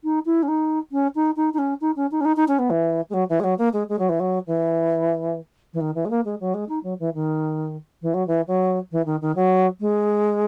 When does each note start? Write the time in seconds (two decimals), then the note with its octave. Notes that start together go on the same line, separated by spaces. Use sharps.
0.04 D#4
0.25 E4
0.42 C#4
0.48 D#4
0.92 C#4
1.15 D#4
1.36 D#4
1.53 D#4
1.58 C#4
1.81 D#4
1.96 C#4
2.11 D#4
2.20 C#4
2.25 D#4
2.36 D#4
2.48 C#4
2.59 B3
2.70 E3
3.09 G#3
3.13 F#3
3.29 E3
3.40 G#3
3.44 F#3
3.58 A#3
3.73 G#3
3.89 G#3
3.98 F#3
4.09 E3
4.20 F#3
4.47 E3
5.73 E3
5.80 D#3
5.95 E3
6.05 G#3
6.10 A#3
6.25 G#3
6.40 F#3
6.54 G#3
6.68 D#4
6.83 F#3
6.99 E3
7.14 D#3
8.02 E3
8.14 F#3
8.27 E3
8.47 F#3
8.91 E3
9.06 D#3
9.21 D#3
9.35 F#3
9.80 G#3